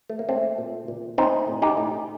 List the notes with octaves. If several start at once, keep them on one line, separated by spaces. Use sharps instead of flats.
A3
A#3
A3 C4
A#2
A#2
A3 C4 D#4
A2
D#4 G4
A2